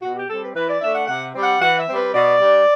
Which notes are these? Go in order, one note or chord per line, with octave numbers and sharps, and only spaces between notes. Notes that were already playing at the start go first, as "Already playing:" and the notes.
B2 F#4
G4
G3 C4 A4
B4
E3 B4
D5
A3 D4 E5
F#5
C3 F#5
G3 C4
F#5
E3 F#5
E5
C4
G3 B4
B2 D5
G3 D4